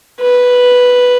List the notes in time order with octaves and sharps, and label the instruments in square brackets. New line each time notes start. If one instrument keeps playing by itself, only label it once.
[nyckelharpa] B4